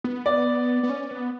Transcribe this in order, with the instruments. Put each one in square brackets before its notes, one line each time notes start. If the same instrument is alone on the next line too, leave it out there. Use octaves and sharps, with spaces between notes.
[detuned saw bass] B3
[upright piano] D5
[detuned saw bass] B3
C#4
B3